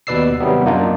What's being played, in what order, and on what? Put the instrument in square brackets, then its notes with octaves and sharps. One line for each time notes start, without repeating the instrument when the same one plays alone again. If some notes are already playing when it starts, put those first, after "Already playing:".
[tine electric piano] D#2 B2 B4 D5 E6 C7
C3 D#3 F#3 G3 B3
F#2 A#3 D4 D#4 F4